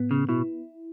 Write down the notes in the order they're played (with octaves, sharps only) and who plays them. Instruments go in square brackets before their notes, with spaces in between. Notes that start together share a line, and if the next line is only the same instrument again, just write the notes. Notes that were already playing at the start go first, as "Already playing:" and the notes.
Already playing: [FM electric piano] A2 B3
[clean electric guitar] C#3
[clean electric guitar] B2 [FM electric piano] E4